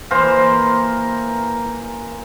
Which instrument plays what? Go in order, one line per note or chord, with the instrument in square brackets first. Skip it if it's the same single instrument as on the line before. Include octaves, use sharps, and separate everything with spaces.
[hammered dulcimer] E3 A#3 A#4 C5